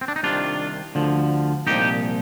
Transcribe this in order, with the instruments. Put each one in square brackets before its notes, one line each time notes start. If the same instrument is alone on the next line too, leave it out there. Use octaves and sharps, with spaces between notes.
[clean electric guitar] C4
D4
D#4
C2 C3 D#3 D4 F4
D2 D3 F3
C2 A#2 F3 D#4 G4